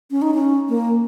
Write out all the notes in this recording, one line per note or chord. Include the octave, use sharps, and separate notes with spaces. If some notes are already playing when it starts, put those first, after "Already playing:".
C#4
D#4
C#4
A#3